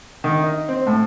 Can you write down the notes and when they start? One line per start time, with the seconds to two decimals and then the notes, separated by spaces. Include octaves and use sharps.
0.24 D#3
0.43 D#4
0.68 C4
0.87 A2